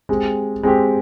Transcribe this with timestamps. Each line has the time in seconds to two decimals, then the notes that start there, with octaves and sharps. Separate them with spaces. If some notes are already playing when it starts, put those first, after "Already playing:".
0.09 G#3 C4 G4
0.63 G#3 C4 G4